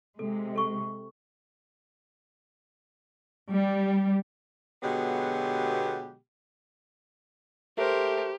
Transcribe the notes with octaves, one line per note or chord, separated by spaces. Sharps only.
C3 G#3 A4
A4 C#6
G3
B2 D3 F#3 G#3 B3 G4
A3 G4 A#4 C5